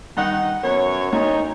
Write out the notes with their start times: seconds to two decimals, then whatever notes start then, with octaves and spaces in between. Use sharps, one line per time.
0.17 G2 D#3 D#4 F#5
0.63 F#2 B3 C#5
1.13 D2 D#4